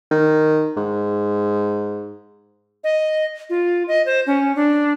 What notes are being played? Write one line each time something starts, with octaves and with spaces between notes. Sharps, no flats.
D#3
G#2
D#5
F4
D#5
C5
C#4
D4